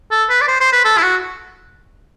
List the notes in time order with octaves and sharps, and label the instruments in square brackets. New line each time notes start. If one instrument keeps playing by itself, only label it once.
[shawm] A4
B4
D5
C5
C5
B4
A4
E4
F#4